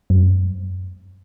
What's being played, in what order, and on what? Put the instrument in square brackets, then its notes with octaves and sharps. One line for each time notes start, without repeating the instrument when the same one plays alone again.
[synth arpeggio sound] F#2